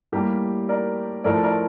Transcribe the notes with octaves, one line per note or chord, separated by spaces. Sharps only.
A2 G3 A#3 G4 A#4
A#4 D5
A2 F3 A3 A#4 D5
A#4 D5